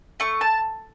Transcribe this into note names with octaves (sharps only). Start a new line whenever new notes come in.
A3 C#6
A5